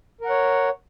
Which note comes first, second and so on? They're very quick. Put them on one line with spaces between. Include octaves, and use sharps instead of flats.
A#4 F#5 C#5